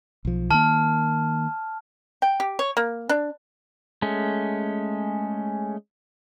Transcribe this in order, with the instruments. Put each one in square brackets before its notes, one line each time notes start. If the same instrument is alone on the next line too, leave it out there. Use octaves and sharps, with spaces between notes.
[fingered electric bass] B1 F3
[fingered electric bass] D#3 A#3 [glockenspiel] A5 F6
[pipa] G5
G4
C#5
A#3
D4
[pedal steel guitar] G#3 A3 C#4